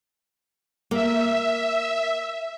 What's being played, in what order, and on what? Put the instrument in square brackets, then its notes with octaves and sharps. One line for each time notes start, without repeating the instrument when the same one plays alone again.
[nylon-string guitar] A#3 [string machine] E5